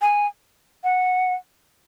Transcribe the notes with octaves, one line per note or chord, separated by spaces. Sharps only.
G#5
F#5